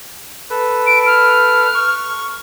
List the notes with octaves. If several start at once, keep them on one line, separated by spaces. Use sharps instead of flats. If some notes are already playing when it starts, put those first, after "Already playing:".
A4 B4
D7
F6
C#6